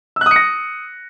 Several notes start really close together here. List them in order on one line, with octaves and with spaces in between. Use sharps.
E6 F#6 D#6 C#7 A#6